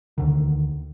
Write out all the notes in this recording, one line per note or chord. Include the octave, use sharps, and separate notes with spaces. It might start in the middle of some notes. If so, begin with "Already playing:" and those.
D2 D3 D#3